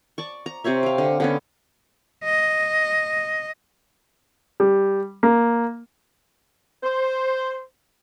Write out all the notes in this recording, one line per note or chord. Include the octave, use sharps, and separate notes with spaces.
D5 A5 C#6
A#5
C3 C4 C#5 E5
F5 G5
D3
D3 B3 C#4
D#5
G3
A#3
C5